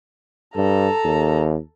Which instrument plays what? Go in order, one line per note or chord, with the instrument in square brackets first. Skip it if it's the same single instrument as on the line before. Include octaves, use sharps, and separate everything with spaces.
[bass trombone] G2 [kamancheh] A4 A#5
[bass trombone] D#2